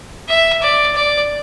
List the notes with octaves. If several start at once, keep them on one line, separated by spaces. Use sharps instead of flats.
E5
D5
D5